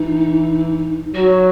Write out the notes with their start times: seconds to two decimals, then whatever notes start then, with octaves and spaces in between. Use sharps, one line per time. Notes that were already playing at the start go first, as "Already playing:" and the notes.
Already playing: E3 D#4
1.14 F#3 F#4